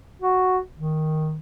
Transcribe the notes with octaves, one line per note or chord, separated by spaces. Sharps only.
F#4
D#3